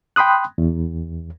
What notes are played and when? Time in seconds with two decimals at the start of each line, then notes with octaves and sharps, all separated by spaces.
0.16 G5 B5 C6 D#6 F#6
0.58 E2